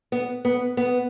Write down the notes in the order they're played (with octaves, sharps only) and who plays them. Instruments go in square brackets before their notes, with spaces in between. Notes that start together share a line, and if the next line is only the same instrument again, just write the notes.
[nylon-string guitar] B3
B3
B3